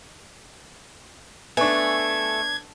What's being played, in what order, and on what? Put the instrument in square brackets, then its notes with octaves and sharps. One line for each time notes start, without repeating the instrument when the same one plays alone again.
[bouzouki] A3 [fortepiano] B3 D4 [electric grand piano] G#5 C#6 [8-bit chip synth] G#6